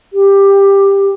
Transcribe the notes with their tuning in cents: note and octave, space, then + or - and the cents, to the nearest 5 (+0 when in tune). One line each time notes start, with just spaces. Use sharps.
G4 +10